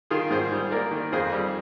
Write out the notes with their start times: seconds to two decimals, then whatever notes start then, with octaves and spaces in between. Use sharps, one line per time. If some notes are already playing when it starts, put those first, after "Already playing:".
0.11 D#3 F4 G#4
0.30 G#2 G#4 C5
0.52 G3
0.71 A#3 A#4 D5
0.91 D#3
1.12 F2 G#4 C5
1.32 G3